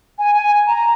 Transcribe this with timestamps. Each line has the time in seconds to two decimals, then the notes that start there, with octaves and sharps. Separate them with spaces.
0.19 G#5
0.35 G#5
0.67 A#5